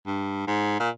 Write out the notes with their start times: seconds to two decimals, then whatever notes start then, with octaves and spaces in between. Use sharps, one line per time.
0.06 G2
0.47 G#2
0.80 A#2